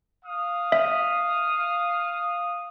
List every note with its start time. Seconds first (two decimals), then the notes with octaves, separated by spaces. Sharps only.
0.24 F5 D#6
0.72 E5